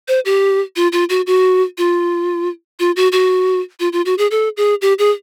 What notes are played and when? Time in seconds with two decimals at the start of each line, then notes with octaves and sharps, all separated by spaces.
0.08 C5
0.25 G4
0.76 F4
0.92 F4
1.10 F#4
1.27 F#4
1.78 F4
2.80 F4
2.96 F#4
3.12 F#4
3.80 F4
3.93 F4
4.06 F#4
4.18 G#4
4.31 A4
4.57 G#4
4.82 G4
4.99 G#4